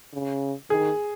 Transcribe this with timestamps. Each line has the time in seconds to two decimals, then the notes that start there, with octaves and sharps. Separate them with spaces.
0.13 C#3
0.70 D#3 G#4